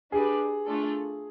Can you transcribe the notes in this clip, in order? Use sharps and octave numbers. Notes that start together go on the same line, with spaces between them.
D4 G4 G#4 B4 D5
A3 D4 F4 A4